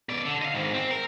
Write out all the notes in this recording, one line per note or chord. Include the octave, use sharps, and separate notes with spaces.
B2 D5
D3
D#5 F5
G#2 D#3
C4
A#4